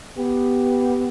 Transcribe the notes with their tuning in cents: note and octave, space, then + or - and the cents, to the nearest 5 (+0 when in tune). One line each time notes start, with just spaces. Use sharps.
B3 +0 G4 +0